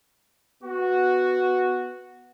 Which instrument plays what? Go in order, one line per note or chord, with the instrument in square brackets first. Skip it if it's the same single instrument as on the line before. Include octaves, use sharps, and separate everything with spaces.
[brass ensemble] B3 F#4